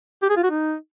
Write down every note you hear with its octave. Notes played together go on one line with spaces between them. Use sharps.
G4
G#4
F4
F#4
D#4